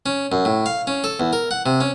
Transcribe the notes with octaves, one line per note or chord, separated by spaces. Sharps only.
C#4
F#2
A2
F5
C#4
A4
E2
A#4
F#5
C3
C#4